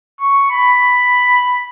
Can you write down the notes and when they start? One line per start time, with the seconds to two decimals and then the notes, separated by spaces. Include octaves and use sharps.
0.21 C#6
0.50 B5